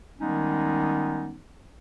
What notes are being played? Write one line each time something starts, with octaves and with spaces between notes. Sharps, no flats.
D#3 G3 G#3 B3 C#4 D#4